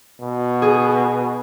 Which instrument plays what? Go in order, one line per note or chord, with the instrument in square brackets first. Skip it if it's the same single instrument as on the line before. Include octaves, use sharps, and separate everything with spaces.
[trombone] B2
[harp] G#4